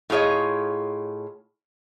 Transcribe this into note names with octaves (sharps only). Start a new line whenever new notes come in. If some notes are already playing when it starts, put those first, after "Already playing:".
A2 F4 G#4 C#5 D#5